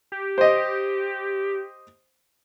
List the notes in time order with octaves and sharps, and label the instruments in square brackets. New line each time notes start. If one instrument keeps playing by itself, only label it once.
[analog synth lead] G4
[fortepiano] C5 D#5